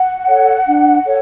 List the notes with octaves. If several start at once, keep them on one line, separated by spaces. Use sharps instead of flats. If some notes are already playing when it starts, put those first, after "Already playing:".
Already playing: F#5
A4 C#5
D4
A4 C#5